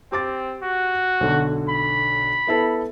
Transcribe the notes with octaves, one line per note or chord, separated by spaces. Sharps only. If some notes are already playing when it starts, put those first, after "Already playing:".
C4 G4 D6 A6
F#4
B1 D3
B5
B3 E4 A4